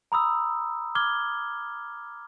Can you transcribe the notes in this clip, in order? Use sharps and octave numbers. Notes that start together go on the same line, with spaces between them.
A#5 B5 D#6 E6
D6 F6 G#6 G7